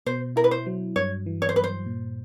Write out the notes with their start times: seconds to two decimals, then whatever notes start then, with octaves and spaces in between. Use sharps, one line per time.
0.06 B2 C5
0.36 E4 A#4
0.44 B4
0.51 C5
0.66 F#3
0.96 G2 C#5
1.26 E3
1.42 C#5
1.49 C5
1.56 G2 B4
1.64 C5
1.86 A#2